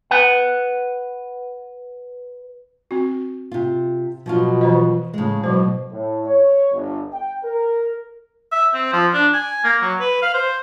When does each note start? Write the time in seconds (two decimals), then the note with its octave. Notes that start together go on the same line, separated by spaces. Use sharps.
0.11 B4 F#5
2.91 C4 F#4
3.52 C3 F4
4.26 B2 F3 F#3 F4
4.61 E3 C5 D#5
5.14 A2 C#3 G#3
5.44 B2 F#3 C5
5.91 A2
6.26 C#5
6.72 G1
7.13 G5
7.44 A#4
8.52 E5
8.74 C4
8.93 F3
9.14 D4
9.34 G#5
9.64 A#3
9.82 F#3
10.00 B4
10.22 F5
10.34 C5